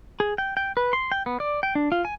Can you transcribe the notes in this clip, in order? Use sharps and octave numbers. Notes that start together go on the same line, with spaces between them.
G#4
G5
G5
B4
C6
G5
B3
D5
G5
D4
F4
G#5